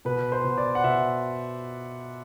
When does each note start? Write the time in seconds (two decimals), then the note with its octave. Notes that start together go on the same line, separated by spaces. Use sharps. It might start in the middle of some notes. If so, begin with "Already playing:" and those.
0.05 B2 B4
0.32 C5
0.44 B2
0.58 D5
0.75 F#5
0.84 B2 E5